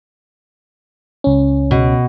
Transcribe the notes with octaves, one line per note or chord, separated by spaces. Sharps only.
C#2 C#4
B2